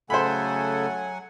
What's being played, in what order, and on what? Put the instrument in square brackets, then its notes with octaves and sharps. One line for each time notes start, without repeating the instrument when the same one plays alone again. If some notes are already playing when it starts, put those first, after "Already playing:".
[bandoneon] C#3 A3 A4 [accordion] F#3 F#5 G#5 [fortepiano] C5 B5